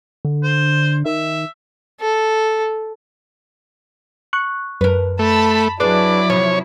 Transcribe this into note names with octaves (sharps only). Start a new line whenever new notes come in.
D3
C5
D#3 E5
A4
C#6 F#6
F#2 A#4 B4
A3 A5 B5
F#3 D4 E4 G#4 B4 D5
C3 F3 C#5